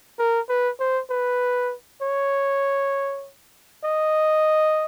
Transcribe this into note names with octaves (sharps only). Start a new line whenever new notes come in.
A#4
B4
C5
B4
C#5
D#5